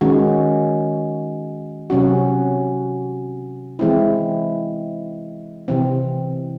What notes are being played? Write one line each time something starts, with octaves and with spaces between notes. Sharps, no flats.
D#3 G#3 C#4 F#4
C3 F#3 C#4 F#4
E3 G#3 C4 E4
C3 E3 C4